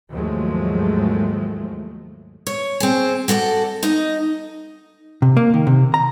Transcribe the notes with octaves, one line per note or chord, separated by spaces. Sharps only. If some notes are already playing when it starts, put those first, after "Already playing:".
D#2 G#2 F3 F#3 G#3 A3
C#5
C4 G#4
F#4 A4 B4 D5
D#4 D#5
C3
A#3
D#3
C3
A#5